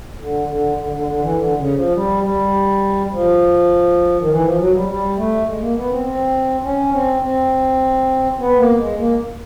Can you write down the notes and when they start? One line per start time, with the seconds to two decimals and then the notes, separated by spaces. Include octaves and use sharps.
0.20 D3
0.48 D3
0.78 D3
0.92 D3
1.07 D3
1.22 E3
1.36 D3
1.56 C#3
1.75 F3
1.94 G3
2.24 G3
3.12 F3
4.21 D#3
4.29 E3
4.44 F3
4.58 F#3
4.73 G3
4.88 G3
5.17 A3
5.46 G#3
5.60 A#3
5.76 B3
5.90 C4
6.04 C4
6.63 C#4
6.92 C4
7.22 C4
8.39 B3
8.58 A#3
8.77 G#3
8.97 A#3